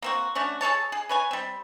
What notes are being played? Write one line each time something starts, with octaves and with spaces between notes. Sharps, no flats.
A#3 C4 F#4
A3 C#4 D4 F#4
G#4 A4 C#5 A5
G#4
B4 C#5 G#5
G3 C4